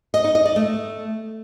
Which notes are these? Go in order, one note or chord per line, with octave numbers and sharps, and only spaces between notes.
D#5
D#4
D#5
D5
A3